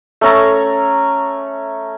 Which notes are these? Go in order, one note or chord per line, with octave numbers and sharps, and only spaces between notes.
A3 C#4 A#5